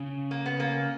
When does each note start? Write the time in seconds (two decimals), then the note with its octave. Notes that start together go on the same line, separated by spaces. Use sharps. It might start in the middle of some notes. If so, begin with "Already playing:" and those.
Already playing: C#3
0.31 A#3
0.46 B3
0.60 A#3